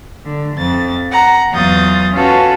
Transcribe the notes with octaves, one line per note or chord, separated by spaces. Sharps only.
D3
F2 A6
F#5 A#5
E2 F#3 F4 D#6 G6 A6
C#4 F4 F#4 A4 B4